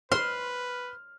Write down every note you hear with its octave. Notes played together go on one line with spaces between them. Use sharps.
B4 C5 C6 F6